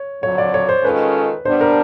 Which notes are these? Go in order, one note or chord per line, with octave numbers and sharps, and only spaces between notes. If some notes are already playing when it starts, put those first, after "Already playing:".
Already playing: C#5
F2 D3 F#3 C#5
D5
C#5
C5
D#3 G#3 C#4 F4 A4 B4
G3 B3 D4 C5
A#4